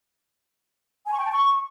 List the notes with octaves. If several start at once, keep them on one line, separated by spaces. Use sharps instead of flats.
G#5
C#6
G5
A5
C#6